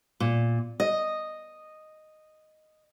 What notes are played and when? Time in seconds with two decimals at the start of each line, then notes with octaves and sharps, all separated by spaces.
0.20 A#2
0.80 D#5